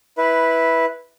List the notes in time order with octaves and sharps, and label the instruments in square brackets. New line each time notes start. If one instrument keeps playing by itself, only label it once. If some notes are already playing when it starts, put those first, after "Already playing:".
[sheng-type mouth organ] E4 B4